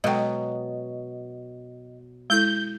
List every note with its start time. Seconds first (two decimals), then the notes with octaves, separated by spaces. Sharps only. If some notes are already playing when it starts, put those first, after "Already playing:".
0.04 B2 F#3 G#3 A4 D#5 G5
2.30 G#3 E4 A4 G6